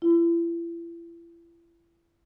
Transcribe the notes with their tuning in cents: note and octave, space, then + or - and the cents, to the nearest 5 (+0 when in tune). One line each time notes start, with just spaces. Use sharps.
E4 +40